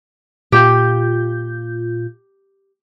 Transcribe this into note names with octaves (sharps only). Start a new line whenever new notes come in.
A#2 F4 G4 G6